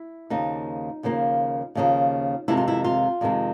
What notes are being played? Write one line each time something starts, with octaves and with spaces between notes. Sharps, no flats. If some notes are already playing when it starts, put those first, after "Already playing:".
Already playing: E4
D#2 C#3 F3 A#3 D#4
D#2 C#3 F3 A#3
D#2 C#3 F3 A#3
F2 C3 D#3 G#3 E4
F4
E4
F4
F2 C3 D#3 G#3